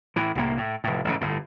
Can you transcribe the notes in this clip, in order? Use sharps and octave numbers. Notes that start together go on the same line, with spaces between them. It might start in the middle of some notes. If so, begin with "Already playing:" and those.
A2 E3
C2 A2 A#3
A2
F1 A2
A1 G#2 C#3
G1 A2